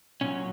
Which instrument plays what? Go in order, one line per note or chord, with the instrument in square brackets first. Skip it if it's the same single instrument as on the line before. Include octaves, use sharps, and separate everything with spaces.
[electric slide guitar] A#2 F#3 C#4